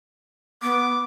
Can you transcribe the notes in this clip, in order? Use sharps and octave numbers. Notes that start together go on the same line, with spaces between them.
B3 D6